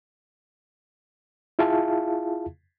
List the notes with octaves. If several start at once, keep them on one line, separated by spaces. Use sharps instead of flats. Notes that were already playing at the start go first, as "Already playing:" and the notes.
E4 F4 G#4 E5 F5 A5